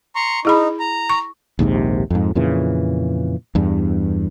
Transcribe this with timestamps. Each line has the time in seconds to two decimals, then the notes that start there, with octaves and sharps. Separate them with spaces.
0.15 A#5 C6 C#6
0.45 D#4 E4 G#4 B5
0.80 A#5
1.10 C#6
1.59 A#1 D#2 G#2 C3
2.10 F2 G#2
2.35 F2 A#2 C#3 E3
3.55 E2 G2